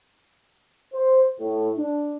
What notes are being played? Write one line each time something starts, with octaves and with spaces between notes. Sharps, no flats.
C5
A2
D4